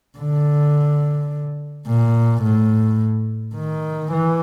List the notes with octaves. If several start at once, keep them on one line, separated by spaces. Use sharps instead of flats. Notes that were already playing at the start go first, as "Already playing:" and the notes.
D3
A#2
A2
D#3
E3